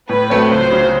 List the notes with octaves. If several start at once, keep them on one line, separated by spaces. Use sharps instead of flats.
A2 B4
F#3 A3 C4
C#2 C5
C#3 F#3